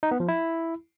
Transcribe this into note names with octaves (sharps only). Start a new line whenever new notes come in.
D#4
B3
F3
E4